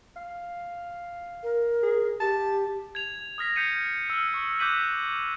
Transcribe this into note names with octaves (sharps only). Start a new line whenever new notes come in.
F5
A#4
G#4
G4 A5
G#6 F7
D#6 F6 A#6 B6
G6 C7 C#7 D#7 F7
E6 F6
C#6
D6 F#6 G6 B6 D#7 F#7